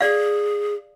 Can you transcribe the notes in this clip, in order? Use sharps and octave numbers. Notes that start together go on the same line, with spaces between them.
G#4 D5 F5